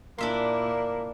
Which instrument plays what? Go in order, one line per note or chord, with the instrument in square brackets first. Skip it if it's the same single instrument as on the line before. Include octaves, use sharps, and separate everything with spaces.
[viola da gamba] A#2 E4 [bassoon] A#3 [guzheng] D4 E5 C6